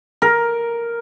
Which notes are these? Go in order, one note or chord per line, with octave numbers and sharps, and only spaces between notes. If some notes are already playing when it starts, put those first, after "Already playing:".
A#4